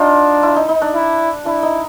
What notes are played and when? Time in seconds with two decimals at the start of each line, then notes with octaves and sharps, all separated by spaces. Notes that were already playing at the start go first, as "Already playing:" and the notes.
Already playing: D4 D#4 F4
0.43 E4
0.56 D#4
0.69 D#4
0.82 D4
0.94 E4
1.46 D4 E4
1.63 D#4